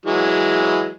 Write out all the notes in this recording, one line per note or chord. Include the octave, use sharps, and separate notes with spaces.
E3 F#3 G#3